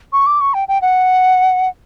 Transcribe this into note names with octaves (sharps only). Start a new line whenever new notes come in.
C#6
D6
C#6
G5
G5
F#5